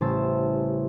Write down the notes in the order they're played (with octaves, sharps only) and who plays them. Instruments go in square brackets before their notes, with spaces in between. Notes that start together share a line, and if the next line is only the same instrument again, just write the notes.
[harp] A1 C#3 G3 C5 A5 E6